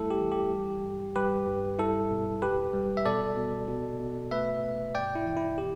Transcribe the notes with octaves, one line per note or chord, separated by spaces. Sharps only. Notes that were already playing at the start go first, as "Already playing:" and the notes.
Already playing: E2 G3 A3 E4 A4
G4
E3
G4
G3
G2
G3 G4 B4
G2
G3 E4 A4
B2
E2 G4 B4
G3
E5
B2 A4 D5
B2
B2
B2
A3 B4 E5
B2
G2 D5 G5
E4
E3
E4
B2 G4